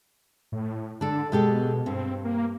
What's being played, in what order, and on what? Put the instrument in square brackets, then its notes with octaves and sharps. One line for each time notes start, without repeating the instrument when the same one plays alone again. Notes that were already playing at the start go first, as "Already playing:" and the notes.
[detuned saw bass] A2
[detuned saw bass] D3 [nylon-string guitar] D4 A4
[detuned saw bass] B2 [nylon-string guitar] G#3 G4 A4
[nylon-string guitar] G2 [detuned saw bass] C4
[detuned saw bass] A#3